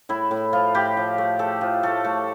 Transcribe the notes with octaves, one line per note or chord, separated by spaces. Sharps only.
A2 E4
A2
F3 F4
A2 G4
F3
A3
A3 A4
F3
A3 A4
A3